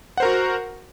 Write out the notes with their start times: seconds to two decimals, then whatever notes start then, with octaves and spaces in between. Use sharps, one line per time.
0.17 F#5
0.20 C5
0.23 A#4
0.25 F#4